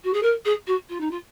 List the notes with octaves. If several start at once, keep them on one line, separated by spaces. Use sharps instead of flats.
F#4
G#4
A#4
G#4
F#4
F4
D#4
F4